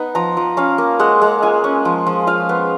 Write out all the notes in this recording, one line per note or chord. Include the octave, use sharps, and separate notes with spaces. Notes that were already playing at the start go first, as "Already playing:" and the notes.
Already playing: B3 D#4
F3 A#5
F3
C#4 F5
A#3
G#3 F#5
G#3
F4 G#5
C#4
F3
F3
F4 F5
B3